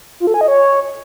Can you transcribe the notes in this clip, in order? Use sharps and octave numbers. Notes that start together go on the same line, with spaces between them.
F4
A4
G#5
D#5
C#5